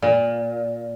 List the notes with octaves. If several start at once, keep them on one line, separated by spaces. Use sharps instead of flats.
A#2